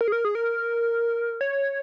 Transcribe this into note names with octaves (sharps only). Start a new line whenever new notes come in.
A#4
G#4
A#4
G#4
A#4
C#5